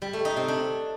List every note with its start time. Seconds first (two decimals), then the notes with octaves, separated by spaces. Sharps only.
0.02 G3
0.13 A3
0.25 D#4
0.37 C3
0.48 D4